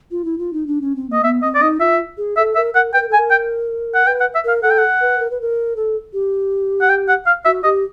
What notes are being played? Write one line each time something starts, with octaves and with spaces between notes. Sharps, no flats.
F4
E4
F4
D#4
D4
C#4
C4
A#3 D#5
B3 E5
C4 D#5
D5
D#4 D#5
F4 E5
G#4
A4 E5
A#4 E5
A#4 F#5
B4 G5
A#4
A4
G#5
A#4
G5
F#5
B4 G5
F#5
E5
A#4 F5
A4 F#5
G5
F#5
B4
A#4
B4
A#4
A4
G4
F#5
G5
F#5
F5
F#4 E5
G4 D#5